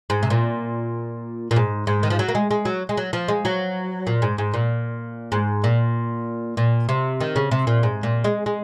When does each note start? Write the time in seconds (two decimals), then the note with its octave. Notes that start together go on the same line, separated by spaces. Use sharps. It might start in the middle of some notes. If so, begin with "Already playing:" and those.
0.10 G#2
0.23 C3
0.30 A#2
1.51 A#2
1.56 G#2
1.87 G#2
2.03 D#3
2.10 F3
2.19 F#3
2.28 A#3
2.35 G#3
2.51 G#3
2.65 F#3
2.89 G#3
2.97 F#3
3.13 F3
3.28 G#3
3.45 F#3
4.07 A#2
4.22 G#2
4.38 G#2
4.54 A#2
5.32 G#2
5.64 A#2
6.57 A#2
6.89 C3
7.20 D#3
7.36 C#3
7.51 C3
7.67 A#2
7.83 G#2
8.03 A#2
8.24 G#3
8.46 G#3